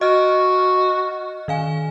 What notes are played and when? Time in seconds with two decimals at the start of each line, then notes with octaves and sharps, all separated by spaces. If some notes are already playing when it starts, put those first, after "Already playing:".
0.01 F#4 D#5 F6
1.48 D#3 F5 G#5